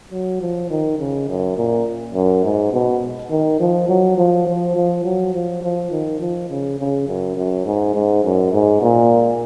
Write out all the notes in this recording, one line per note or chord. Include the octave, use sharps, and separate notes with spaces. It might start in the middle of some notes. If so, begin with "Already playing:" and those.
F#3
F3
D#3
C#3
F#2
A#2
F#2
G#2
B2
D#3
F3
F#3
F3
F3
F3
F#3
F3
F3
D#3
F3
C#3
C#3
F#2
F#2
G#2
G#2
F#2
G#2
A#2